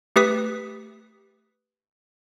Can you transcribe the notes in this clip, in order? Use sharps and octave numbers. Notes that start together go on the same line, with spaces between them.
A3 G4 B4 D#6 B6